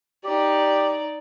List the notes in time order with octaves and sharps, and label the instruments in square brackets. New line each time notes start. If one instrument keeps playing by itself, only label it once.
[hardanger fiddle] D#4 D5 [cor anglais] G4